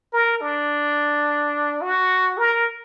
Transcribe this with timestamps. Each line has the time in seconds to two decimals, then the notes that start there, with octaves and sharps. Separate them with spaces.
0.13 A#4
0.41 D4
1.82 F#4
2.38 A#4